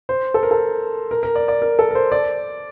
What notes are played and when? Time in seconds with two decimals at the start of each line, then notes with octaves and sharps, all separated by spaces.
0.09 C5
0.34 A4
0.43 A#4
0.51 A4
1.11 A#4
1.23 A#4
1.35 D5
1.48 D5
1.62 A#4
1.79 A4
1.91 A#4
1.95 C5
2.12 D5